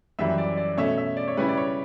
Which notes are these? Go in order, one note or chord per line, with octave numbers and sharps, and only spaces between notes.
F#2 E3 G3 E5
D5
D5
B2 A3 C#4 E5
E5
D5
C#5
C#3 G3 C#4 E4 B4
D5
C#5